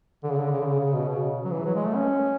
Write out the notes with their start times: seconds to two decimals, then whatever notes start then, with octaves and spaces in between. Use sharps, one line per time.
0.24 D3
0.30 C#3
0.38 D3
0.51 C#3
0.61 D3
0.65 C#3
0.80 C#3
0.94 B2
1.08 C#3
1.45 F#3
1.51 E3
1.65 F#3
1.75 G#3
1.85 A3
1.95 C#4